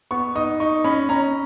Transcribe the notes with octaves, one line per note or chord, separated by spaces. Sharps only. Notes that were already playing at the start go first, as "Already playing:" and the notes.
B3 C#6
D#4 D#6
D#4 C#6
C#4 B5
C#4 A#5